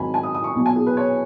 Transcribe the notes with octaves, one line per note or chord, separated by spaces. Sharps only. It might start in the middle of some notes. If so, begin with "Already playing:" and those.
Already playing: G#1 G#2 D#3 F#3 G#5 B5
G#5
D#6
D#6
C#6
B1 B2 F#3
G#5
G#4
B4
C#5